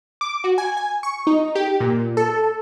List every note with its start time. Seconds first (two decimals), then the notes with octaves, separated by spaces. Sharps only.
0.21 D6
0.44 F#4
0.58 G#5
0.77 G#5
1.03 C#6
1.27 D#4
1.55 G4
1.80 A#2
2.17 A4